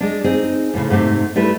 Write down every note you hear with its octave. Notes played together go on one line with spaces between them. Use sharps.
G#3 D4
C4 D#4 G#4
F2 A2 C#3
G#2 C3 A3 C4
G3 A3 E4 B4